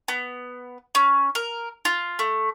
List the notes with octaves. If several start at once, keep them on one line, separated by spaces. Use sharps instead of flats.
B3
C#4
A#4
F4
A3